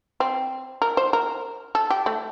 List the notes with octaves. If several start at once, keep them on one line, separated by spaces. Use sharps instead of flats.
C4
A#4
C5
A#4
A4
G4
A3